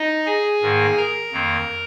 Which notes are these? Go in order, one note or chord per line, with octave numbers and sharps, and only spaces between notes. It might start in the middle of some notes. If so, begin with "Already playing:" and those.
Already playing: D#4 D#5
G#4 G#5
G#2 D#3 A#3
A#4 A#5
F2 D#3 A#3